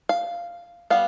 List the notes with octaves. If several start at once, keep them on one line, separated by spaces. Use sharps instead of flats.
F5
G3 B3 F5